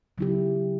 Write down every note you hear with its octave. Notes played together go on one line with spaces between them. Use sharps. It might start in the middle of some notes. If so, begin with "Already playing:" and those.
C#3 F#3 B3 E4 G4